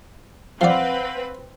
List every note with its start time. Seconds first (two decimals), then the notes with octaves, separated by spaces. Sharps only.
0.61 F3 C4 B4 D5 F5 F#5